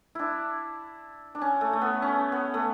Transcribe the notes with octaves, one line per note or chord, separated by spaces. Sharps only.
D4 E4
D4
C#4
A3
A3
B3
C#4
B3
A3